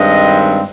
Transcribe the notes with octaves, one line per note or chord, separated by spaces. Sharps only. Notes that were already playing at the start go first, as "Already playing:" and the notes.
Already playing: G2 D#3 G#3 C4 D#5